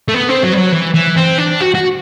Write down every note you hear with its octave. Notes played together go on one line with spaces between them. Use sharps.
A3
B3
C4
F#3
G3
F#3
E3
E3
C4
D4
F#4
F#4